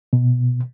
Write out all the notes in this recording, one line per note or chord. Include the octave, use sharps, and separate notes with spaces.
B2